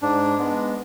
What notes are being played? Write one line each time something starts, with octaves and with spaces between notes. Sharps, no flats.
G#2 D4
G#3 B3